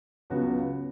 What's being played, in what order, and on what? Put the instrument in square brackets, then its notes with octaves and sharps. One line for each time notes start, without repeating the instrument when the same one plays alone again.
[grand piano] C#2 C#3 F#3 B3 F#4